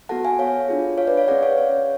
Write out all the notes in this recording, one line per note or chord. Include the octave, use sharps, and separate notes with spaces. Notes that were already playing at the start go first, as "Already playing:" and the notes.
B3 F#4 A4 F#5 A5
F5 G#5
C#5 F5
D4 F4 G#4
C#5 F5
B4 D5
C#5 F5
C#4 G#4 D5 F#5
C#5 F5
C#5